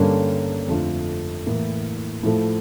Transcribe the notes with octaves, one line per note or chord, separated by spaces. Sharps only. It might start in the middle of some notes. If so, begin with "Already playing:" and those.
Already playing: G2 D3 G3 A#3 C#4
F2 D3 A3 D4 F4
A2 E3 A#3 E4
A2 F3 A3